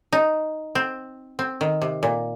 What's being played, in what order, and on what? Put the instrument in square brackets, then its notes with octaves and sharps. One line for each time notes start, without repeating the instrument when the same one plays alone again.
[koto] D#4
C4
C4
D#3
C3
A#2